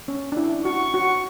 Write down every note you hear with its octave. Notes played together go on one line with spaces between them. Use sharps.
C#4
D4
E4
F#4 C#6
F#4